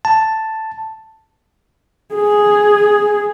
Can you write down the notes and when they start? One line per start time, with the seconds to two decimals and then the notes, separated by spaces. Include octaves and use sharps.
0.05 A5
2.15 G#4